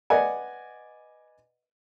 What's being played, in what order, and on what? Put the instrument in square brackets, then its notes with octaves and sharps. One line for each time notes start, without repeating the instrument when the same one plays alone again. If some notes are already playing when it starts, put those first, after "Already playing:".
[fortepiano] B4 D5 D#5 F#5 G#5